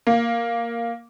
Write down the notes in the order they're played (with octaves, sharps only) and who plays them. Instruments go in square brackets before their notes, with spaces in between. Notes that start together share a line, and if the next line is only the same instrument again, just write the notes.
[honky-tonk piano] A#3